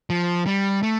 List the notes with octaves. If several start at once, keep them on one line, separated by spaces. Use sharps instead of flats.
F3
G3
A3